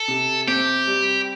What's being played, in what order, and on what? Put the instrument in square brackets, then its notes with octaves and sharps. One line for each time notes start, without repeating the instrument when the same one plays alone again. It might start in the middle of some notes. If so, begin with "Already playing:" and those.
Already playing: [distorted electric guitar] A4
[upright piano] C3
[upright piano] C4 [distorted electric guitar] G4
[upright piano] G3